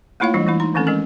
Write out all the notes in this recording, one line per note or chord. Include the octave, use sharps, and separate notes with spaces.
A3 A#3 E4 F4 C#5 F5
E3 G3 G#3 D4
E3 A3 E4
D#4 C6
D#3 E3 A3 C4 C#4 A4
G#3 C#4 A#4